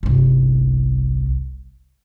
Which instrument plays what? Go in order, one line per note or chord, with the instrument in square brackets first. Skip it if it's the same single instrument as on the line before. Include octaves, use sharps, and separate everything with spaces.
[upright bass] G1 C2